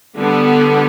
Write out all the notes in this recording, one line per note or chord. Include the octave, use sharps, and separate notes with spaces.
D3 G3 B3